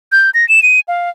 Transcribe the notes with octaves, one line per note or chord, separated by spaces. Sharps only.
G6
A#6
E7
D#7
F5